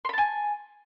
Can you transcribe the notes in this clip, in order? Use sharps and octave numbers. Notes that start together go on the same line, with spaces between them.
G#5 A5 B5 C6